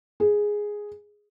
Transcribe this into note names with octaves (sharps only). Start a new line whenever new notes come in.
G#4